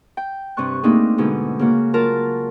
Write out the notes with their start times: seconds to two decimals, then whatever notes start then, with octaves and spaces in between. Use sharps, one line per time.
0.17 G5
0.57 G2 C3 C4 D5 C#6 F#6
0.83 A3 A#3 C4 D4 D#4 G#4
1.18 G#2 B2 D3 G#3
1.59 C#3 A#3 F#4
1.94 F#3 F4 A#4 A5